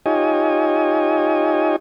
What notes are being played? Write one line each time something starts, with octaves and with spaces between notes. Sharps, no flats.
D#4 F4 G4 C#5 D#5 G#5